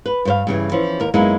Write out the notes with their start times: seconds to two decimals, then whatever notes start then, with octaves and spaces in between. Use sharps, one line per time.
0.06 B4
0.25 G2 C5 F5
0.47 G2 C#3 E3
0.72 E3 F3 C#4
1.00 D#2 A#4
1.14 F#2 G#3 A#3 B3 D#4 E4